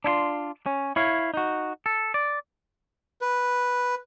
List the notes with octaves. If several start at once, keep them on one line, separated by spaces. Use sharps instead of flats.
D4 E4 F4 C6
C#4
E4 C#5 F5
D#4 F#4
A4
D5
B4